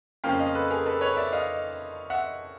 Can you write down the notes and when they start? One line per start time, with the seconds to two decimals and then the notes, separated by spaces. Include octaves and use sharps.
0.24 F2 C#3 F3 A#3 C#4 F5 G5
0.39 D#5 F5
0.55 A4 B4
0.70 G#4 A#4
0.86 A4 B4
1.01 B4 C#5
1.17 D5 E5
1.33 D#5 F5
2.10 E5 F#5